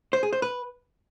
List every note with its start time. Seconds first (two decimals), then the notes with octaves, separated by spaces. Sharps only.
0.13 C5
0.23 G#4
0.33 C5
0.42 B4